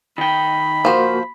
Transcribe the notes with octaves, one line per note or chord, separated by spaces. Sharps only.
D#3 G5 B5
F3 A#3 F#4 C5